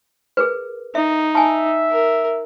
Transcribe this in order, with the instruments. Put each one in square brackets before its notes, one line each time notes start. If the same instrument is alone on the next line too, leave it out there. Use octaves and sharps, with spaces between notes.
[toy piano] G#4 A#4 B4
[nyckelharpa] D#4 [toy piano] E5
[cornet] E5 [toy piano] G#5 A5
[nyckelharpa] A#4